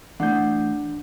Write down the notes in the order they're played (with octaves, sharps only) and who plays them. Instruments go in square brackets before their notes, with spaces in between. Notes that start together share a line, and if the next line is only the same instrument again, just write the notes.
[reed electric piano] E3 A3 G6 [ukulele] D4 F#5